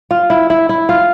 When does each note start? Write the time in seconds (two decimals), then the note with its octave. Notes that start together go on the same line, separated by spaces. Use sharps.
0.11 F4
0.30 E4
0.50 E4
0.69 E4
0.89 F4